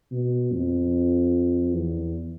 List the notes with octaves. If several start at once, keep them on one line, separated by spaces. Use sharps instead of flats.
B2
F2
E2